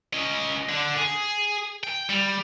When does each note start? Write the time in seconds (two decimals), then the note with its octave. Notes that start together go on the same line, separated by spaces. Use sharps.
0.13 C#4 D#5
0.69 D3
0.98 G#4
1.83 G5
2.09 G3